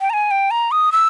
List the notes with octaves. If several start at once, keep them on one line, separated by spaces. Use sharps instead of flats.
G5
A#5
G#5
G5
A#5
D#6
E6